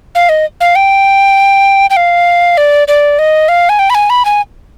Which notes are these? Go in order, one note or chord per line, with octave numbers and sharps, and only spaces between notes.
F5
D#5
F5
G5
G5
F5
D5
D5
D#5
F5
G#5
G5
B5
G#5
B5
G#5